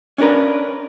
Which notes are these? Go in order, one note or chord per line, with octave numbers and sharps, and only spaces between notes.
C#4 D4 G4 A#4 B4